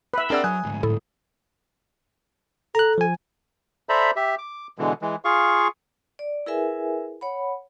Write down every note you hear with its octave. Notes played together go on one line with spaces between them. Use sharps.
B4 E5
C4 D4 G#4 A#4 D5 F#5 G5 E6
F#3 G#5 D#6 F#6
D2 G#2
A2 E4 A4
A4 A#5 F#6
F3 G#5
A4 C5 D5 E5 A#5 B5
G4 E5
D6
B2 D3 E3 G#3
E3 G#3
F4 G#4 F5 C#6
D5
E4 G#4 A#4 B4 E5 G#5
C#5 F#5 B5